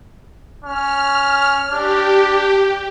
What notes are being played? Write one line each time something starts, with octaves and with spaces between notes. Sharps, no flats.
C#4 F6
D4 G4